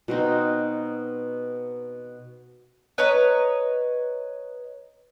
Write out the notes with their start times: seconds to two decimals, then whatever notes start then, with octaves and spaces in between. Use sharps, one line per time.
0.08 B2 C4 D#4
2.98 B4 C#5 D#5 A#5